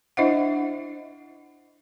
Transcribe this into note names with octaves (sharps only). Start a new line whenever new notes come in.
D4 E4 C5 D#5 E5 F#5